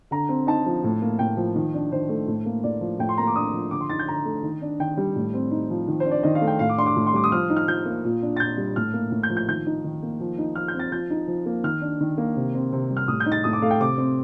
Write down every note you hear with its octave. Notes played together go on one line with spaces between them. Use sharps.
D3 A#5
C4
D#4 A5
F3
A2
A#3
A2 G5
F3
D#3
D4
D#3 C5
A3
A2
A#3
A2 D5
F3
A2 G5
C6
A#3 A#5
D6
D4 D#6
F3
D3 D6
C6
D#4 A6
G6
D3 A#5
A3
D#3
D4
D#3 G5
G3
A2
C4
D#4
F3
D#3
C5
D4
D5
D#3 D#5
F5
A3
G5
A2 F5
D6
D4 C6
D6
A2
C6
G3 D6
D#6
F3 F6
D#4
F6
F3 G6
A#3
A#2
D4
A6
A#2 G6
G3
A2 F6
A#3
A2
G6
F3
G6
D#3 G6
D#4
D#3
A#3
F3
D#4
F3 F6
G6
C4
A6
F3 G6
D#4
F3
A#3
D#3 F6
D4
D#3
A#3
C3
C4
C3
G3
F6
A2 D#6
G6
D#4
A6
A2 D#6
D6
A3 F5
G5
C3 D6
C4